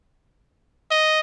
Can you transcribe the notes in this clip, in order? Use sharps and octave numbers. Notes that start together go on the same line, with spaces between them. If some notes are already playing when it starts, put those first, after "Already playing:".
D#5